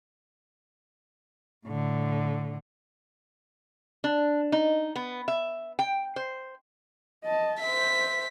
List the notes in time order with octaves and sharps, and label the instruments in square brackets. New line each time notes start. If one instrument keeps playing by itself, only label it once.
[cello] A2 D3
[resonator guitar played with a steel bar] D4
D#4
B3
E5
G5
C5
[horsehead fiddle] D#5 A5
[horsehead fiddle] C5 E5 [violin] B6